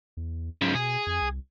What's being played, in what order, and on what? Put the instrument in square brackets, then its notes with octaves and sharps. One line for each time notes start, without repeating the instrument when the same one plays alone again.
[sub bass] E2
[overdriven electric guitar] G#2 C#3 [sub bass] F#3
[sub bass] B2 [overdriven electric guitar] G#4
[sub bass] F2
C2